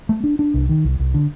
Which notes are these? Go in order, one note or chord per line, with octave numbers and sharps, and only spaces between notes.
A3
D4
D4
C2
D#3
C2
C2
D3